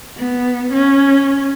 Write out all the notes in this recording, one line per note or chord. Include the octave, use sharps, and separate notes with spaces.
B3
C#4